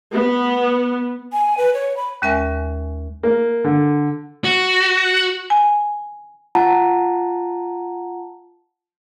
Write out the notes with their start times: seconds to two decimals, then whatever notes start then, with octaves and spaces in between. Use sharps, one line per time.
0.14 B3
1.33 G#5
1.58 B4
1.74 C#5
1.97 B5
2.22 D#2 G#3 C#4 A#4 E5 G#5
3.23 A#3
3.64 D3
4.44 F#4
5.50 G#5
6.55 F4 F#5 A5 A#5